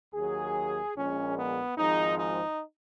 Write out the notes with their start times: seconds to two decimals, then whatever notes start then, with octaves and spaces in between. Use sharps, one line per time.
0.14 D#2 D#3 F#3 G#4
0.95 A#1 A#2 F3 G#3 C#4
1.36 B3
1.77 G#1 G#2 F3 G#3 D#4
2.18 D#4